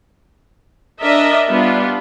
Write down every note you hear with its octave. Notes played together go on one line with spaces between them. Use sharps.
D4 A#4 D#5 E5
G3 B3 D4 F4